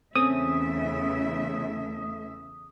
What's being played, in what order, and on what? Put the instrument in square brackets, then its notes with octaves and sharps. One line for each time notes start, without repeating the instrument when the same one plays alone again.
[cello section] E2 C#3 E5 [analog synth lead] A3 [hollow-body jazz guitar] C4 C#4 [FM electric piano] D#6